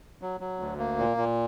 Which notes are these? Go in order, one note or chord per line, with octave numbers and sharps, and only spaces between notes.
F#3
F#3
D2
A#3
A#2
A#2